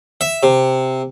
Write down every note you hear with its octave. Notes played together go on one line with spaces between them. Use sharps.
E5
C3